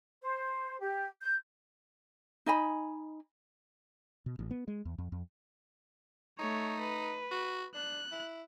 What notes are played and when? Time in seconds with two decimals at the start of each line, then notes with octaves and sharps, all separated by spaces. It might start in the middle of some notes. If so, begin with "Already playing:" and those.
0.21 C5
0.79 G4
1.20 G6
2.46 D#4 D#5 G#5 B5
4.26 B2
4.39 A1
4.51 B3
4.68 G#3
4.85 E2
4.98 F2
5.12 F2
6.39 A3 D#4 C#5
6.81 B4
7.31 F#4
7.75 D4 F#6
8.12 E4